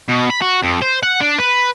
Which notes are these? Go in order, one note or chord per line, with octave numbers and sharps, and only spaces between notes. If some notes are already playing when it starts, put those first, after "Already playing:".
B2
B5
F#4
F2
C5
F#5
D4
B4